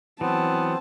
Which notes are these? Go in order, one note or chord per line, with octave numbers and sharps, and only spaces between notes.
E3 F#3 B3 C4 A5